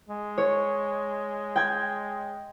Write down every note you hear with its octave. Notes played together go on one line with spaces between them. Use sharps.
G#3
C#5
G5 G#6